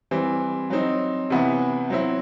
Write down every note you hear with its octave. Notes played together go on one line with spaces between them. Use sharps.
E3 G3 C4
F#3 C4 D#4
C3 E3 B3 E4
F#3 C4 E4